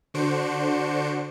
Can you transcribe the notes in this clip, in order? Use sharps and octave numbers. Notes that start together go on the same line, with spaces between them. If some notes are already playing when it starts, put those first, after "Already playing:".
D3 D4 F#4 C5 C#7 D7